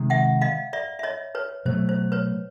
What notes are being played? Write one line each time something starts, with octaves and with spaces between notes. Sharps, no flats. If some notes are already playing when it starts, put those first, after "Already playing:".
Already playing: C3 D#3 G#3
E5 F#5
D#5 F5
D5 E5
E5
C#5 D#5
B4 C#5
B2 F#3 A3 C5
C5
B4 C#5